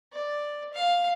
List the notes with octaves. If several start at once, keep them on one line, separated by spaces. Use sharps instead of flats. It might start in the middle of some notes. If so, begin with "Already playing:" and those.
D5
F5